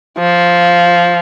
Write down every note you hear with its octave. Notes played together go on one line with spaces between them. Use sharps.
F3